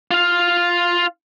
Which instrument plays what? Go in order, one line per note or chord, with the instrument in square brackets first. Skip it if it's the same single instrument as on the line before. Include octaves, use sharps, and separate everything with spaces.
[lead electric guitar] F4 F5